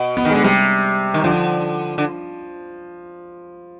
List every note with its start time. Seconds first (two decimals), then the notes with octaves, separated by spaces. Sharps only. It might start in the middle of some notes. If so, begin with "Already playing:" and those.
Already playing: B2
0.17 B3
0.25 D#3
0.30 D3 G#3
0.44 C3 G3
1.14 D#3
1.24 D3 F3
1.98 D3